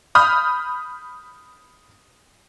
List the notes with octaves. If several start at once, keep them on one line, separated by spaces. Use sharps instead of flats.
B5 D#6 F6 G6